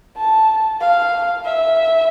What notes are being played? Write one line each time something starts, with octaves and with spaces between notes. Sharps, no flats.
A5
F5
E5